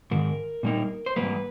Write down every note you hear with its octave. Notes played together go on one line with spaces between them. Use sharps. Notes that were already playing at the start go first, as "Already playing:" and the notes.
G#2 D#3 A#4
A#2 G3 A#3 D#4
C5
G#2 E3 G3 A#3 B4